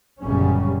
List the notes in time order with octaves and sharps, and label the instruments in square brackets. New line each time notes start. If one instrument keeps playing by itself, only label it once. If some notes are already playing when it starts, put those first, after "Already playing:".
[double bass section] G1 F#2 A#2 C#3 G3 C#4